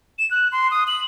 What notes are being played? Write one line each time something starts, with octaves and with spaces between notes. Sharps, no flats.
E7
F#6
C6
D#6
F#7